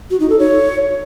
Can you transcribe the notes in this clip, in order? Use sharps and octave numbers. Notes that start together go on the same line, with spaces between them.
F#4
D#4
A4
C#5